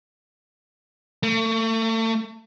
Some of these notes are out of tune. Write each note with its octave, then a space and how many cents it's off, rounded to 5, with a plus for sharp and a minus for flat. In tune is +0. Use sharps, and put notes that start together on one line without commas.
A3 +35